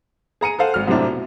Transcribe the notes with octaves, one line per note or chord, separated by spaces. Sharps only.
G#4 A#5 C#7 D#7
A4 C5 F5 F#5
G#1 F#4 F6
F#2 A2 C3 C4 D4 E4
B2